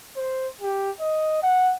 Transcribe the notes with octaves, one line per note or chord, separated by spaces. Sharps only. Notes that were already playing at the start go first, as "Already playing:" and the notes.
C5
G4
D#5
F#5